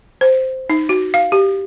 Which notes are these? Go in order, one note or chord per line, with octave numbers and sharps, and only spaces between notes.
C5
D#4
F#4
F5
G4